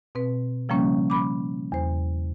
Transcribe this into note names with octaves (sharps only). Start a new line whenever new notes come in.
B2 C4 B4
C#3 F3 G3 A#3 C#4
B5 D6
E2 C5